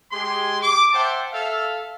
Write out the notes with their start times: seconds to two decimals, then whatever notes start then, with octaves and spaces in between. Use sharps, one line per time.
0.12 G#3 G4 G#4 C6
0.62 D6
0.93 C5 E5 F#5 G5 A5
1.33 A4 E5 F5